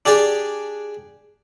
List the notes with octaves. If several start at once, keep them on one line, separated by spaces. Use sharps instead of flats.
D4 G4 G#4 D5